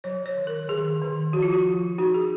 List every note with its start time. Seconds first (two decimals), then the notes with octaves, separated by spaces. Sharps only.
0.04 F#3 C#5
0.26 C#5
0.37 D#3
0.47 A#4
0.69 D#3 G#4
1.01 D#3
1.33 F3 F#4
1.43 F4
1.53 F#4
1.65 F3
1.98 D#4 F#4
2.14 G#4